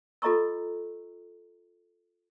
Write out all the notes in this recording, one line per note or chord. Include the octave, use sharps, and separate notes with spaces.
F4 A4 D#5 A#5 C#6 E6